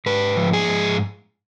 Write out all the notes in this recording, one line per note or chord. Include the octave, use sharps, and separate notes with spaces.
G#2 B4
F3
G#4
G#2